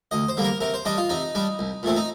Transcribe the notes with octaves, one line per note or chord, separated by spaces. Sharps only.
D2 D#5
C5
D3 G3 A#3
A#4
C3 A#4
C5
G3 D4 D#5
F4
C3 D#4
G3 D4
C2
A#2 A3 C4
D#4